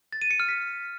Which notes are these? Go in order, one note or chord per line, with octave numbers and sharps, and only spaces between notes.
A6
D#7
C#7
F6
B6